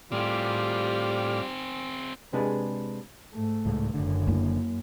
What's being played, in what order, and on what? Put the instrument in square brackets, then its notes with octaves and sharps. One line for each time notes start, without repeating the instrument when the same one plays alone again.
[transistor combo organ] A2 D6 F6 [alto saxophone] G3 [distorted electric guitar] C4 G#4 [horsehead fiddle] F4 G4
[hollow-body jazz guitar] C3 G#3 D4 G#4 B4
[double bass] G#2 A3
[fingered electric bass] C#2 A2 G#3
[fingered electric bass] F#1 B1 D3 [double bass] F#2
[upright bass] A#3 E4